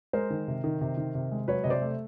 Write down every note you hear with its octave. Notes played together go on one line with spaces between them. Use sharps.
G#3 A#4 C5
D#3
C3
D#3
C3
D#3
C3
G#3
F#3 B4 C#5
C3 D#5
C5 D5
A3